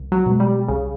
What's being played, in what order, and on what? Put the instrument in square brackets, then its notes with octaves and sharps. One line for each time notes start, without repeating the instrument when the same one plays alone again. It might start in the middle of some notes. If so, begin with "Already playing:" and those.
Already playing: [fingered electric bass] C2
[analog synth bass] F#3
[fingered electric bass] B2 G#3
[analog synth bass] G3
[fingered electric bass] C2 [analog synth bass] C#3